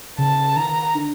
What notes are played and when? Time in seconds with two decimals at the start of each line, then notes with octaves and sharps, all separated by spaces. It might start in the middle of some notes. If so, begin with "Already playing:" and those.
0.18 C#3 A5
0.56 D#3 A#5
0.94 D3